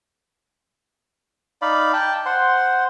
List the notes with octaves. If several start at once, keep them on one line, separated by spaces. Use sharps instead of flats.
D#4 D5 F5 B5
G5 A5
C5 F#5 C6